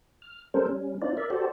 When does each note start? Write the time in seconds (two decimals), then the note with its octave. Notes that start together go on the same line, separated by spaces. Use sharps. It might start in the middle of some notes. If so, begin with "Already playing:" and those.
0.22 F6
0.54 G3 C4 C#4 A4 A#4 C5
0.67 G3 C#4
1.02 C4 D4 D#4 F4 D5
1.17 A#4 D5 E5
1.30 F#4 G4 A4 C5 D5